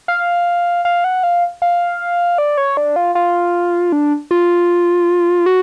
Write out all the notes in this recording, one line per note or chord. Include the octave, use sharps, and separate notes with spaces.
F5
F5
F#5
F5
F5
D5
C#5
D4
F4
F4
D4
F4
F#4